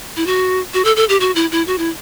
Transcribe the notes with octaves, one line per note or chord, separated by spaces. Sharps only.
E4
F#4
F#4
A4
A4
G4
F#4
E4
E4
F#4
E4